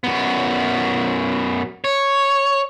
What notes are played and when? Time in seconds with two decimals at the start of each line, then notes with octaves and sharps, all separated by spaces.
0.04 F#2 B3
1.84 C#5